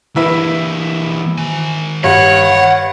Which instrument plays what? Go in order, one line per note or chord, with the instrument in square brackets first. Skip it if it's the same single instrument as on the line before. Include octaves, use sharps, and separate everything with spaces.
[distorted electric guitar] E3 A#3 [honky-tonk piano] E4 B4 E5
[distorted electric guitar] D#3 G#5
[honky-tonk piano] G2 [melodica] C#5 [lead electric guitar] F#5